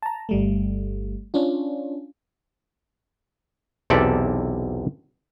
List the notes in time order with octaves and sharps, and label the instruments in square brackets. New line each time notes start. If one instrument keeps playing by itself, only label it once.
[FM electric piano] A5 A#5
G1 G3 A3
C#4 D4 F4
[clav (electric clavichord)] B1 E2 C3 A4 D5 E5